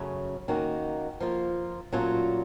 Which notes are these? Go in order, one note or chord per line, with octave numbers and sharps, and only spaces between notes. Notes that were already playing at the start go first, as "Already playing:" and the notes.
Already playing: F#2 C#3 A3 C#4
D#3 A#3 C#4 F#4
F3 A#3 F4
A#2 F#3 A3 C#4 F4